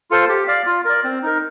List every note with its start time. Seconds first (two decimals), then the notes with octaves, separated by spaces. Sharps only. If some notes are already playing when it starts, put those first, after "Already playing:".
0.11 F4 A4 C5
0.29 G4
0.47 D5 F5
0.66 F4
0.85 A#4 D5
1.04 C4
1.23 D#4 A#4